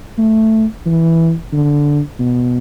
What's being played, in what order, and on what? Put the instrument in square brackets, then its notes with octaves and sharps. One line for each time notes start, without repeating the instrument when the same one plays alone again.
[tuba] A3
E3
D3
B2